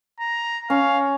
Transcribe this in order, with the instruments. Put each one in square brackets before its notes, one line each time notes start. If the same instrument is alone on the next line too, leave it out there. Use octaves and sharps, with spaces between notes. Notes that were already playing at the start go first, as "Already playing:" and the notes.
[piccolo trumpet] A#5
[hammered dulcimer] C#4 [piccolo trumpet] F5